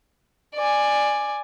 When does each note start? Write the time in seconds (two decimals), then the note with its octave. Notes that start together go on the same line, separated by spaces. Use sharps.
0.55 D5 G#5